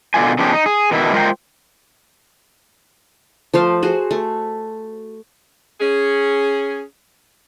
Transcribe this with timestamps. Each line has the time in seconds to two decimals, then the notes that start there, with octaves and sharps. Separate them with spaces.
0.14 B2 D3 D#3 F4 G#5
0.39 C#3 F3 B3 C#4 D4 G4
0.53 D#4
0.66 G#4
0.91 B2 D#3 E4
1.13 G#3 F4 A#4 C5 G5
3.54 F3 A3 C5 F5
3.83 F#4 G#4 C5
4.11 A3
5.81 C#4 G#4